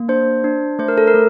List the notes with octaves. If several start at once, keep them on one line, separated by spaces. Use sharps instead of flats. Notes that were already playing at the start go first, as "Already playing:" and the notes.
Already playing: A#3
D4 C5
D4
A3 C5
A#4
A4
A#4
A3